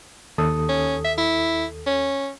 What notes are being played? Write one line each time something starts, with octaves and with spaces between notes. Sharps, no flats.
D#2 A4 D#6
C#4
E5
E4
C#4